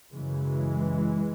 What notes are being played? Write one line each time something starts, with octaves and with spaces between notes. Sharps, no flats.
F#2 C#3 E3 G#3